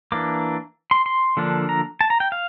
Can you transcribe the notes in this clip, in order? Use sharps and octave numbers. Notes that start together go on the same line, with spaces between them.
E3 A#3 D4 D6
C6
C6
D3 F3 A#3 D4
A#5
A5
A#5
G5
F5